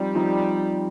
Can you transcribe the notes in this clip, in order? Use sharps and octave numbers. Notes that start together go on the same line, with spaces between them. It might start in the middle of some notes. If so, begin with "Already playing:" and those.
Already playing: F3 G3 C4 D#4
F3 C4 D#4